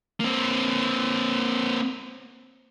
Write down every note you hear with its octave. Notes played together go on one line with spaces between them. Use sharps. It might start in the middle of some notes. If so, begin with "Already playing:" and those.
A#3 C4